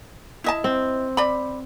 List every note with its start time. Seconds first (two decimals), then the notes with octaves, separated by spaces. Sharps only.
0.44 E4 D#5 A5
0.64 C4
1.17 D5 B5